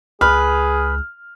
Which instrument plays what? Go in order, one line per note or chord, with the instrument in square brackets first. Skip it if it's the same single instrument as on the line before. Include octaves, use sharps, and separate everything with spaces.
[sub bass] C#2 [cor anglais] G#4 [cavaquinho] B4 [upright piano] F6